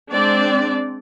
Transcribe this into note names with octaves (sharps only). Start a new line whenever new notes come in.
G#3 C4 D4 D5